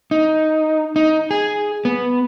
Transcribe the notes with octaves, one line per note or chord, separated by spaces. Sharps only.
D#4
D#4
G#4
B3